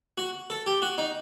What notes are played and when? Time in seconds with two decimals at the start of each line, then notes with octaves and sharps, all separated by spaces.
0.18 F#4
0.50 A4
0.66 G4
0.82 F#4
0.98 D#4